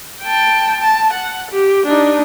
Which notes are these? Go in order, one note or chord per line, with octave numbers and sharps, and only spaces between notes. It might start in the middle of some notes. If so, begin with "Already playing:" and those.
G5 A5
A5
F#5
G4
D4 D#4